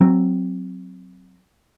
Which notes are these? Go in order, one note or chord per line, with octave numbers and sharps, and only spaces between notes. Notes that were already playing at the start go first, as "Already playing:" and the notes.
F#3 C4